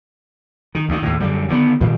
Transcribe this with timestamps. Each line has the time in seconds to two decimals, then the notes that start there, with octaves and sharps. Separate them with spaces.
0.75 D#3
0.89 D2 D#3
1.02 D#2 A2
1.20 F#2 D3 G3
1.49 D3 D#3 F#3 B3
1.81 A#2 D#3 F#3 G3